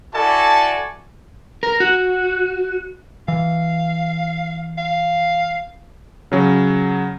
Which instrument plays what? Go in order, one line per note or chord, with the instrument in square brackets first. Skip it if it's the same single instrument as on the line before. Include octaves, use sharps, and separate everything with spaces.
[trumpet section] E4 F#4 A4 D5 G#5 A5
[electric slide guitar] A#4
F#4
[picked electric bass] E3 [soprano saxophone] F5
[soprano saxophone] F5
[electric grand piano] C#3 F#3 C#4